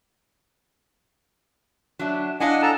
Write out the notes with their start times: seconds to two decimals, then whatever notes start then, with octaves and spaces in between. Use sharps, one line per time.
1.99 F#3 D4 E5
2.40 D4 E4 D#5 F5 F#5 G#5
2.62 A4 A5 A#5